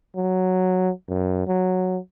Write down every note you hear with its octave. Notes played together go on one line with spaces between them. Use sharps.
F#3
F#2
F#3